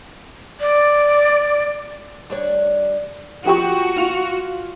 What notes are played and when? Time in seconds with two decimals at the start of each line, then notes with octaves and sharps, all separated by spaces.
0.60 D5
2.30 G3 D4 C#5
3.45 F3 F#4 G4 C#6
3.96 F4 F7